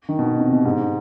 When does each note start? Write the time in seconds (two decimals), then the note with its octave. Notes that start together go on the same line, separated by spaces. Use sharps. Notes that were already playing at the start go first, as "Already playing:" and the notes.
0.09 D#3
0.19 B2
0.40 C3
0.52 B2
0.65 G#2